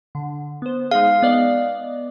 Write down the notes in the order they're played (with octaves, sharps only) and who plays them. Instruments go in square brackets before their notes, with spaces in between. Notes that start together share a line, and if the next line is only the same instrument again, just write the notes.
[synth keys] D3
B3 C5
[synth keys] G#3 D#4 G#4 [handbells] F5
[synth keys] B3 D5 D#5